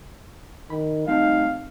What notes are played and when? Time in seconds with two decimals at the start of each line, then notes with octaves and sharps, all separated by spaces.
0.70 D#3 B5
1.07 G3 A3 C4 D#4 F5